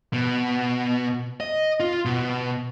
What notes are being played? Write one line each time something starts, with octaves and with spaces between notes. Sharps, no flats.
B2
D#5
F4
B2